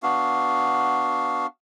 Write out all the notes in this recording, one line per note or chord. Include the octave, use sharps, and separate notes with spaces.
B3 D4 F#4 F5